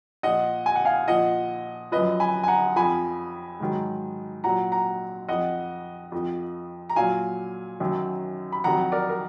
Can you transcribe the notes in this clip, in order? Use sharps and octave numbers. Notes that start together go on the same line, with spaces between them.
A#2 F3 D#5 F#5
G#5
F#5
F5 G#5
A#2 F3 D#5 F#5
F#2 F3 B4 D#5
G#5 B5
G#5
F#5 A#5
F2 F3 G#5 B5
G#2 D#3 F#3
A#2 F#3 F#5 A#5
F#5 A#5
F2 F3 D#5 F#5
F2 F3
A#5
A#2 F#3 F5 G#5
F#2 D#3 F#3
B5
F2 D#3 F#3 F#5 A#5
A#4 D5
A#4